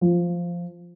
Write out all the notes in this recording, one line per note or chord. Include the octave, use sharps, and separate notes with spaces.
F3